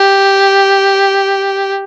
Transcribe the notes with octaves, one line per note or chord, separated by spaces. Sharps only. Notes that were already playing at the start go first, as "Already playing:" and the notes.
Already playing: G4